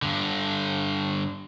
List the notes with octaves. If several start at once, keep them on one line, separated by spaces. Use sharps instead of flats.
G2 D3